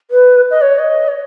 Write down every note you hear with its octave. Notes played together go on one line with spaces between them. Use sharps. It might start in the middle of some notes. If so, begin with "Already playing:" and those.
B4
D#5
C#5
D#5
C#5